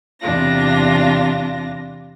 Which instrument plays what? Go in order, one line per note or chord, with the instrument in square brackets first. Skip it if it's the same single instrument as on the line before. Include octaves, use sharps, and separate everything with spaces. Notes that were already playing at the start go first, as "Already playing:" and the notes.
[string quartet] E2 C3 D4 F4 A#6